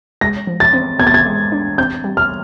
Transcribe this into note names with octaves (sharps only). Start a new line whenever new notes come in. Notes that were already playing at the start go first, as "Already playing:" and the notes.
G#3 A#6
F3
A6
C4
B3 G#6
A6
G#6
G#3
D4
C4 G6
G3
F6